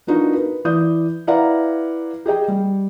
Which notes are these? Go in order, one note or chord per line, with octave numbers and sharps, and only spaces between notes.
B3 D4 D#4 F4 F#4 A#4
B4
E3 D5 D#6 G6
E4 B4 D5 F5 F#5 A#5
G4 G#4 D#5 G5
G3